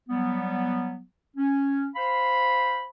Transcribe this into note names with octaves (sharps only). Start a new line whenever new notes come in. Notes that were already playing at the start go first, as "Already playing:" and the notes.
F#3 G3 B3
C#4
C5 F5 B5